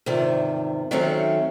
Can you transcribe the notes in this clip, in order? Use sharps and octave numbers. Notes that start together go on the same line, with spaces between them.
E2 G#2 C3 D#3 F3
D#3 F#3 A3 C4 C#4